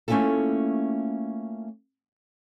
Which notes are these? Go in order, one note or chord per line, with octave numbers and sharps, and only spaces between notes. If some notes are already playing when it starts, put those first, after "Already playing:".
A3 A#3 C#4 E4 F4 A4